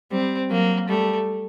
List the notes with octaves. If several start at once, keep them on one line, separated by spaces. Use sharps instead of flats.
G3 C4
F#3 A#3
G3 A3